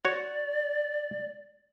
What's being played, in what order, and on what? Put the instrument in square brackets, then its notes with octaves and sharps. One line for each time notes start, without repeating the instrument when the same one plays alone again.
[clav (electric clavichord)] F#4 C#5 [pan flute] D5